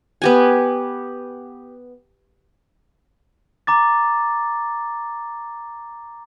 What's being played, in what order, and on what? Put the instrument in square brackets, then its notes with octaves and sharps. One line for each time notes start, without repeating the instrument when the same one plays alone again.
[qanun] B3 G4 G#5
[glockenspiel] A#5 D6 A6